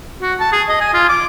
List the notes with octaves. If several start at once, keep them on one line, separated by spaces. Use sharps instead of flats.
F#4
A5
G#4
D#5
G#5
F4
D6